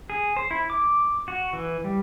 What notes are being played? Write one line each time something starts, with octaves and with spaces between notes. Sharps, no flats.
G#4
C5
E4
D6
F#4
E3
G3